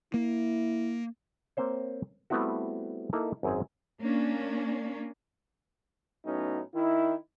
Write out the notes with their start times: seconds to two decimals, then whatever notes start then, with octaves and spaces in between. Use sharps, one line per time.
0.14 A#3 E4
1.57 A#3 C4 C5 C#5
2.30 G3 A3 B3 C4 E4 F#4
3.13 A#3 D#4 E4 A4
3.43 G#1 F#2 C4 G#4
4.01 A#3 C#4 D4
6.26 A2 F#3 B3 C#4 D#4
6.75 D#3 D#4 E4